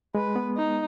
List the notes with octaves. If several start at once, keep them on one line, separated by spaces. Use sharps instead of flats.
G#3 B4
B3
D#4